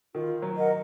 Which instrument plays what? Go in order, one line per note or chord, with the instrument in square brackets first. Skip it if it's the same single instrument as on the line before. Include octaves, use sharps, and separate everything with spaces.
[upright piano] D#3 [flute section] F4
[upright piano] F#3
[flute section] A#4 D#5 F#5